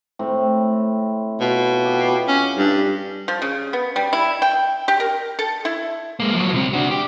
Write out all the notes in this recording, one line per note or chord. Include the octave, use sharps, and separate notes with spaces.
A2 C4
B2 F4
G4
C#4
G2 G3
F3
C#3
B3
G3
E4
G5
G4
A#4
A4
E4
G#3 A#3
F3 F#3
C2 C4
D4 F#4
G4